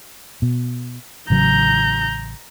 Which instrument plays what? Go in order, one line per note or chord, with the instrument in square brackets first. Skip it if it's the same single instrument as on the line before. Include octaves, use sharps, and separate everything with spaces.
[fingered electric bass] B2
[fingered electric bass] A1 C#3 F#3 [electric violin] A#5 G6